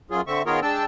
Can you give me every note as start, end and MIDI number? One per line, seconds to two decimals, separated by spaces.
0.10 0.21 42
0.10 0.21 54
0.10 0.21 65
0.10 0.21 68
0.27 0.42 50
0.27 0.42 60
0.27 0.42 76
0.27 0.42 85
0.46 0.60 51
0.46 0.60 59
0.46 0.60 65
0.46 0.60 68
0.46 0.60 70
0.46 0.60 73
0.62 0.85 56
0.62 0.85 62
0.62 0.85 79
0.62 0.85 81
0.62 0.85 88